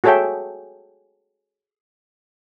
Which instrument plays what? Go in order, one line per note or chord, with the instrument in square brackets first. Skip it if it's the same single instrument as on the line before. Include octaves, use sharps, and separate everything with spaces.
[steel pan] F#4 G#4 A4 C#5 E5 G5